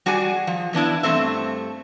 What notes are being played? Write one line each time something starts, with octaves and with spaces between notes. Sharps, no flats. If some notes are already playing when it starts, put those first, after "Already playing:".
G3 F#4 G#4 D5 G#5
F3
E3 B3 D4 E4
G2 E3 A3 C4 E5